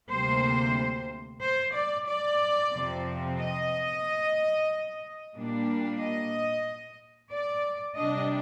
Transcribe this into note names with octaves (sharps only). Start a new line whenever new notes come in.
D2 C3 G3 A#3 C5
C5
D5
D5
F2 C3 F3 C4
D#5
A#2 G3 A#3 D4
D#5
D5
C3 G3 D4 D#5